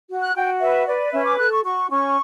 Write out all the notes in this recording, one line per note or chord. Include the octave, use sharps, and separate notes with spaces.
F#4
F#6
F#4 G5
B4 E5
B4 D5
C#4 E5
D6
A4 F#6
C#6
F#4 C#6
C#4 C#6